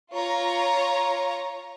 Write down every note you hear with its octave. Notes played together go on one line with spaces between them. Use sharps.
F4 C#5 A#5